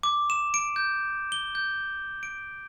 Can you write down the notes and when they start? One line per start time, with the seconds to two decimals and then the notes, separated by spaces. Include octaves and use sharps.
0.03 D6
0.30 E7
0.54 D7
0.76 G6
1.32 G7
1.55 G6
2.23 D7